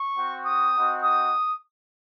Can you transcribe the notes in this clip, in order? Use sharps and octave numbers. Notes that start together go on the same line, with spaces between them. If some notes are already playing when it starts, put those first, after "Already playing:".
Already playing: C#6
C4 F#4
D#6
C4 D#4 F#4
D#6